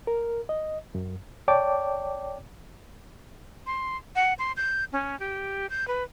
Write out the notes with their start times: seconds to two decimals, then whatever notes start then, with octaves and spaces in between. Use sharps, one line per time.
0.07 A#4
0.49 D#5
0.95 F#2
1.48 C#5 D5 G5 A5 D6
3.67 C6
4.16 F#5
4.39 C6
4.57 G6
4.93 C#4
5.20 G4
5.70 G6
5.88 B4